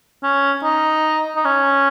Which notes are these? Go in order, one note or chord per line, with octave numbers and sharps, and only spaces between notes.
C#4
D#4
D#4
C#4